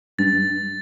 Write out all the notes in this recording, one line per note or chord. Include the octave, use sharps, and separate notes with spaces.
G2 A6